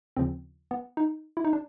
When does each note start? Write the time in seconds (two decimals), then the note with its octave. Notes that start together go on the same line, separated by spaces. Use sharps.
0.17 D#2 C#3 F3 C4
0.71 B3
0.97 D#4
1.37 E4
1.44 D#4
1.53 D4